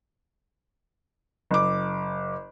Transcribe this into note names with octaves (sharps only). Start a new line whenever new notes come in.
F#1 D6